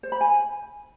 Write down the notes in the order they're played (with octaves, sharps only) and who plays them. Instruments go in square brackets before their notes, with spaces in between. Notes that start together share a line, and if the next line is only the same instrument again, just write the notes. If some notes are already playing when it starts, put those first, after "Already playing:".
[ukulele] C5
B5
G#5